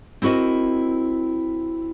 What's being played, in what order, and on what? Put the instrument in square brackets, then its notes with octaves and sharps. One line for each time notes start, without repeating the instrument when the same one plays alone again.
[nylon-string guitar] C4 E4 F#4 A#4 D#5